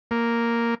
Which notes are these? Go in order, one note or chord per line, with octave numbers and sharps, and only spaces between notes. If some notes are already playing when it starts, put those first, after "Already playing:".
A#3